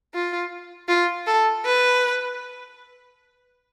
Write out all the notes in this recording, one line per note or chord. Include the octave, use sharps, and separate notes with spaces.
F4
F4
A4
B4